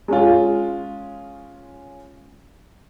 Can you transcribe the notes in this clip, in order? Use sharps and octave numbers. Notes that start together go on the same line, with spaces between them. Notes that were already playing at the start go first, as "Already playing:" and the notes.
G#3 C#4 F4